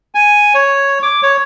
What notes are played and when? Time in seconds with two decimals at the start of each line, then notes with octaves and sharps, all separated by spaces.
0.15 G#5
0.54 C#5
1.03 D6
1.23 C#5